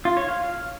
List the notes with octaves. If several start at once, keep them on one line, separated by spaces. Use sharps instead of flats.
F4
C#5
F5